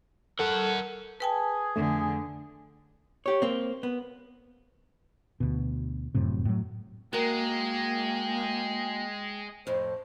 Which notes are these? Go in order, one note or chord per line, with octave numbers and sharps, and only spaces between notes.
A4 A#4 F#5
G#4 B4 G5 A5
F2 D3 A3
G4 C#5
A#3 C4
B3
D2 B2
F1 F#2 A2 C3
A2 F#3
G#3 A#3 F#4 A#4 G5
F2 A2 C5